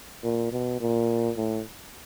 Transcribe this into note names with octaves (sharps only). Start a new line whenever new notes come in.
A#2
B2
A#2
A2